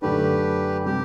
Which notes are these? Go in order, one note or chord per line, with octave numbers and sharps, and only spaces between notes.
F#2 D3 A3 D4 G4 B4
C3 G3 G4